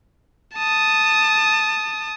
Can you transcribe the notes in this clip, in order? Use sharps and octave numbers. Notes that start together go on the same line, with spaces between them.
A5 D#6